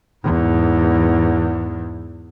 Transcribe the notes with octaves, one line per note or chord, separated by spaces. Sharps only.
E2 G#2